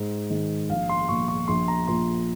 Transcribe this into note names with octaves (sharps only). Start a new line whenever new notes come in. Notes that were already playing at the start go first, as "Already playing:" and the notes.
Already playing: G#2
D#3 G#3
A#1 F5
C6
A#2 F3 C#6
C#6
A#1 C6
A#5
A#2 F3 C6